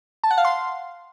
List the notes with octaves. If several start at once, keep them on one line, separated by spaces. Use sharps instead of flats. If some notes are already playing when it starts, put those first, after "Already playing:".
A5
F#5
F5
C6